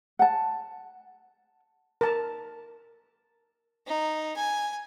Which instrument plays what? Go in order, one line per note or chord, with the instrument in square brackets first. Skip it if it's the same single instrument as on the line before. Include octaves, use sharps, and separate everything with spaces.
[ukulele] F#5 A5
[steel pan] A#4 A5
[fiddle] D#4
G#5